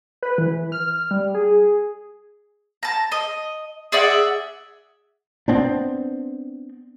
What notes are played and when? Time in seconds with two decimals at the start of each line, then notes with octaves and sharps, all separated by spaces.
0.22 B4
0.38 E3
0.72 F6
1.11 G3
1.34 G#4
2.83 A5 A#5
3.12 D#5
3.92 G#4 D5 E5 F#5
5.48 B3 C4 D4